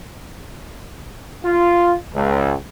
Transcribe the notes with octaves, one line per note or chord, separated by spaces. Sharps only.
F4
C#2